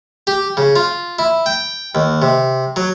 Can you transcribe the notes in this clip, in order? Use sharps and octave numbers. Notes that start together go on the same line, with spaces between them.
G4
C#3
F4
E4
G5
D#2
C3
F#3